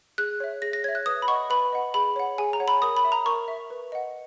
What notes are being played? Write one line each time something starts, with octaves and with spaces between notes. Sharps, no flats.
G#4 F#6
C#5 E5
G#4 A#6
A#6
C#5 E5 G#6
F#6
B4 D#6
B5
D#5 F#5 C#6
B4 B5
D#5 F#5
G#4 B5
C#5 F#5
G#4 G#5
A#5
C#5 F#5
B5
A#4 D#6
B5
E5
A#5
A#4 C#6
E5
B4
D#5 F#5